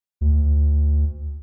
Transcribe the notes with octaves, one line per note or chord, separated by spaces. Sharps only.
D2